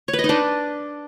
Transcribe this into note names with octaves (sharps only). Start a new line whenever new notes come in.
C#5
B4
D#5
D#4
D4